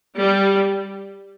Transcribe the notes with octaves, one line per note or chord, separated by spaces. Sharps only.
G3